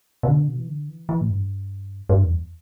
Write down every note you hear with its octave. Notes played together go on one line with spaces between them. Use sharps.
B2
D3
B2
E3
D3
E3
E3
A2
G2
G2
E2